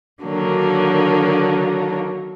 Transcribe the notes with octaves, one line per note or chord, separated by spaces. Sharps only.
D3 D#3 F#3 A#3 D4